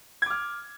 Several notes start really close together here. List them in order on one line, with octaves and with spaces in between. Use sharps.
G#6 D6 F6